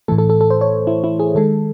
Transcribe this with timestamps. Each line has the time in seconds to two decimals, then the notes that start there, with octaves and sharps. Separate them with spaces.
0.08 A2 E3 A3 A4
0.18 A4
0.30 A4
0.41 A4
0.50 C5
0.61 C#5
0.87 E4
1.04 E4
1.19 G#4
1.35 D#3 G#3 A4